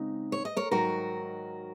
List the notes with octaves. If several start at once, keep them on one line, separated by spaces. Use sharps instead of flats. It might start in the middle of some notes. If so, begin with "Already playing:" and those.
Already playing: C#3 G#3 C4 D#4
C#5
D#5
A#4 C#5
G#2 D#3 F#3 F#4 A#4